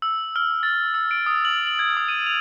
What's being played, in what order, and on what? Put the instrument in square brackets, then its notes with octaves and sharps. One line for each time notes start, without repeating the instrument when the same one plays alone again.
[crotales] E6
F6
A6
E6
D7
D#6
F#7
F#7
G#6
D#6
D#7
F7